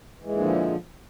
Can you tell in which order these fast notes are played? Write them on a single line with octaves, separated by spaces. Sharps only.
E3 G#3 A#2 D3 F3